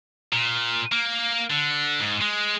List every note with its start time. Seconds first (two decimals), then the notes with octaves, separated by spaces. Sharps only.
0.33 A#2
0.92 A#3
1.50 D3
2.01 G#2
2.22 G#3